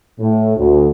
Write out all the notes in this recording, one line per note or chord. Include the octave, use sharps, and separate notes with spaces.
A2
D2